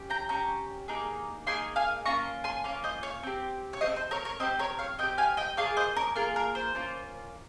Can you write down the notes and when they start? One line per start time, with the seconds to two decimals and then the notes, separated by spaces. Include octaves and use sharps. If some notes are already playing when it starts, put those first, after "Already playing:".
Already playing: C#4 G4
0.10 G5 A#5
0.29 C#4 G4 A#5 C#6
0.88 A#3 D#4 G#4
1.47 A#3 D#4 G#4 G#5 C6
1.76 F5 G#5
2.06 A#3 C#4 F4 A#5 C#6
2.44 G#5 C6
2.64 A#3 C#4 F4 C#5 F5
2.84 C5 D#5
3.03 C#5 F5
3.23 C4 G4
3.73 C#5
3.81 G4 C5 D#5
3.86 C4
3.96 C5
4.11 A#4 C#5
4.25 A#4 C#5
4.40 C4 G4 C5 D#5
4.59 A#4 C#5
4.79 C#5 F5
4.99 C4 D#5 G5
5.03 G4
5.18 F5 G#5
5.37 D#5 G5
5.57 A#3 F4 G#4 C#5 F5
5.77 C5 D#5
5.96 A#4 C#5
6.16 A#3 F4 G#4 A#4
6.36 A#4
6.55 C5
6.75 A#3 C#4 F4